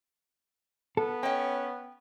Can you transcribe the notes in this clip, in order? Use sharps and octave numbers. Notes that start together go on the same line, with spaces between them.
B3 A4
C#4 D#5 G5